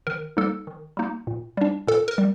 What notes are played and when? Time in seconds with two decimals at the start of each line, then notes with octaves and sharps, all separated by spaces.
0.07 D#3 A#4
0.37 G3 A#3 D#4 A4
0.67 D#3
0.97 G3 A#3 D#4
1.27 A#2
1.57 G3 D4
1.87 A#2 A4
2.08 A#4
2.18 G3